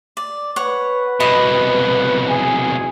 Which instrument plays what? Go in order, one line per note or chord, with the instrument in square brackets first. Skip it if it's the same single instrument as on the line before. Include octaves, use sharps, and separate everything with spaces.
[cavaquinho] D5
[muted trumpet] B4 [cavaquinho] C#5 F#5
[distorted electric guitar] C2 B2 [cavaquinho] D#5 B5
[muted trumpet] G#4